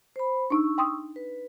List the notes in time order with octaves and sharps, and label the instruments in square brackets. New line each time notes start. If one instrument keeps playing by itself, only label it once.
[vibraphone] C5 B5
[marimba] D4 D#4 [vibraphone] C#6 E6
[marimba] G5 C6 D#6
[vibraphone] B4